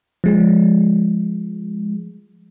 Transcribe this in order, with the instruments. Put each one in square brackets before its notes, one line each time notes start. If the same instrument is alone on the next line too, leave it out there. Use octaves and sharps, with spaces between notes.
[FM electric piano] F3 G#3